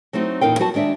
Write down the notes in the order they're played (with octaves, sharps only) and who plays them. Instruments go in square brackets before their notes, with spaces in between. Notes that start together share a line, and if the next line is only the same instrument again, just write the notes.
[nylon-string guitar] F#3 A3 C4 D#4 F#4
E2 A#2 D#4 A#4 F5 G5
F#3 G3 B3 F#4 G#5 A5
D#3 G#3 D4 D5 E5